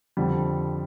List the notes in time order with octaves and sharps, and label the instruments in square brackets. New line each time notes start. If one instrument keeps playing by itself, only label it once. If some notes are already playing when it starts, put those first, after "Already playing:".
[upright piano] F2 D3 G3